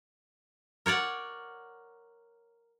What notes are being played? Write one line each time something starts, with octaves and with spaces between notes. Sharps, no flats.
A#4 C#5 D5 F#5